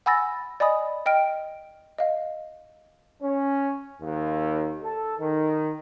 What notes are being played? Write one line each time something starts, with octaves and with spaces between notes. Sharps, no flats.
F#5 G#5 B5 E6 A6 A#6
D5 D#5 G#5 B5 D#6
D#5 G5 F6 D7
D#5 F5
C#4
D#2
A4
D#3